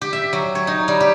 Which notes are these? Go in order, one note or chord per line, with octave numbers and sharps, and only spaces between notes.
G4
E5
F#3
C#5
D#4
G3
G4